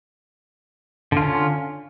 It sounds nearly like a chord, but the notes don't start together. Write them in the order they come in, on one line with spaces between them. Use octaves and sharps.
D3 F4 C#4